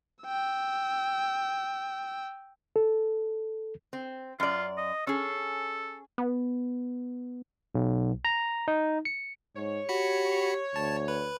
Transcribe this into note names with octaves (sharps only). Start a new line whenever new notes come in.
G5 E6
A4
C4
F#2 F4 D5
D#5
C#4 G#4 A4
B3
B1
A#5
D#4
C#7
G#2 C#5
F#4 G4 B5 C#7
D2 A5
B4